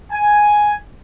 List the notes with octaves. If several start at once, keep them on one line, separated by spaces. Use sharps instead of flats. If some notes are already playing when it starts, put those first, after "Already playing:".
G#5